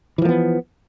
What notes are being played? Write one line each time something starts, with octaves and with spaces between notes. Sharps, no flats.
E3 F3 A#3 B3